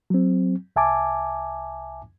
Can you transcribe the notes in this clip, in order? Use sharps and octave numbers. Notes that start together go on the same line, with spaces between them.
F#3 C4
C2 E5 G#5 A5 D6